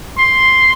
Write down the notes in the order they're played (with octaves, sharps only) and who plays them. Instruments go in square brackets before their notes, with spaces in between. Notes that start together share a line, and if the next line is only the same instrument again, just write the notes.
[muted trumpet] C6